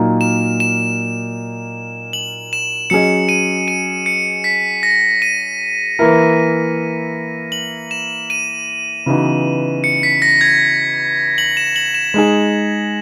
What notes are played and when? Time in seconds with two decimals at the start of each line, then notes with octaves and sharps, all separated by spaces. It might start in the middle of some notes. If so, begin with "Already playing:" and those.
Already playing: A#2 F#3 A#3 D#4
0.21 E7
0.60 E7
2.13 F#7
2.53 E7
2.90 F#3 C#4 G#4 D#5 C#7
3.29 D#7
3.68 D#7
4.06 C#7
4.44 B6
4.83 A#6
5.22 D#7
5.99 E3 A#3 E4 A#4
7.52 F#7
7.91 E7
8.30 D#7
9.06 C#3 E3 B3 D#4 F#4
9.84 C#7
10.03 B6
10.22 A#6
10.41 G#6
11.38 F#7
11.57 E7
11.76 F#7
11.95 E7
12.14 G#3 D#4 G#4